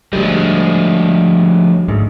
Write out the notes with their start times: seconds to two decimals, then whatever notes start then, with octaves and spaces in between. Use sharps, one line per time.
0.13 D2 F3 G3 G#3
1.88 D2 G#2